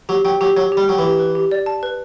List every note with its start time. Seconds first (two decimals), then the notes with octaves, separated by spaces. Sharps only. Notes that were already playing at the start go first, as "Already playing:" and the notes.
0.09 F#3 G4
0.25 F#3 G5
0.41 F#3 G4
0.56 F#3 C#5
0.72 G4
0.77 G3
0.88 F#3 G5
0.99 E3
1.04 G4
1.19 B4
1.35 G4
1.51 D5
1.66 A5
1.83 B4